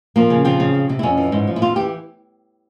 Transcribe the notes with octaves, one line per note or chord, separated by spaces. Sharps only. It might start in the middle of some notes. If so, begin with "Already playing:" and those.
F3 A#3
C#3
F3 C4
C#3
F3
C3
E4
F2 C#4
E3
G#2
F3
E4
E2 F4
E3 G4